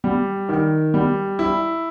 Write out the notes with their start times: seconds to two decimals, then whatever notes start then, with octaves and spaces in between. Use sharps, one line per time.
0.04 G3
0.49 D#3
0.94 G3
1.39 E4